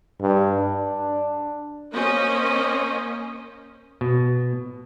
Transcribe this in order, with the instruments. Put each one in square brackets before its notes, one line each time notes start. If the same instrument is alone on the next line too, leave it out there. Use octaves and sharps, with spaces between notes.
[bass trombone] G2
D4
[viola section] A#3 C#4 C5 D#5
[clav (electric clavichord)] B2